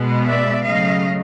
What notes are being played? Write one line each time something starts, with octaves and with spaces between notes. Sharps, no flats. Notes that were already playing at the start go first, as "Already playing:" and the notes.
Already playing: B2 G#3 B3
D5 E5
C#3 F#3 A3 D#5 F5